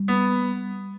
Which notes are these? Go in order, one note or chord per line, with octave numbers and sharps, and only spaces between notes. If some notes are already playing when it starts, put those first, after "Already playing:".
Already playing: G3
B3